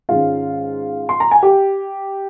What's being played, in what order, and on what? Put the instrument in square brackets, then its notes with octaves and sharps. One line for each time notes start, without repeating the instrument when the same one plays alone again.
[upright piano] G#2 D#3 G#3 C#4 F4 F5
C6
A#5
G#5
G4 G5